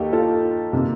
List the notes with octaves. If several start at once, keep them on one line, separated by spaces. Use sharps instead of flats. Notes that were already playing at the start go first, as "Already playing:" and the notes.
Already playing: D#2 D#3 A#3 D#4 G4 A4
F4 A4
C3 D#3 A#3